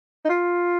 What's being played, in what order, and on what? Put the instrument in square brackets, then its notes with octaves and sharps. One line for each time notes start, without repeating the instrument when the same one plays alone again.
[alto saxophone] D#4
F4